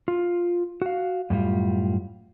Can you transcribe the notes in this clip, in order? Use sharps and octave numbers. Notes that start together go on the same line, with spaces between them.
F4
F#4 F5
F#2 A2 G3 F4